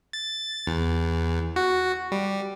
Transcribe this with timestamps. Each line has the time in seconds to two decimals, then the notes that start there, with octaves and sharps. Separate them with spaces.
0.13 A6
0.67 E2
1.56 F#4
2.12 G3